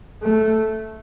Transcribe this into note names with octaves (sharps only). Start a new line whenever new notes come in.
A3